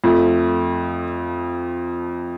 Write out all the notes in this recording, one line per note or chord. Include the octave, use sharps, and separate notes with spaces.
F2 F3 A3